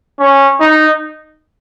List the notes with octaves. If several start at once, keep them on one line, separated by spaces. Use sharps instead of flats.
C#4
D#4